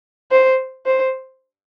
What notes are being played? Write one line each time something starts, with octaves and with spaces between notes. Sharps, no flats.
C5
C5